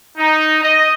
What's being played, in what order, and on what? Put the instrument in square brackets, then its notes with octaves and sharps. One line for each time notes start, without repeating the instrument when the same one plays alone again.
[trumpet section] D#4
D#5